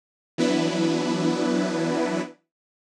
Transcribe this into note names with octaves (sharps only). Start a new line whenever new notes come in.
E3 F#3 B3 D4 E4 B4